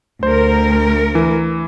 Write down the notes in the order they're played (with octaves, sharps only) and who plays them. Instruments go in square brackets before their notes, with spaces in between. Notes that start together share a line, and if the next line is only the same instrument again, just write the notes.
[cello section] D2 A#4 [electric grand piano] C5
[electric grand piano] E3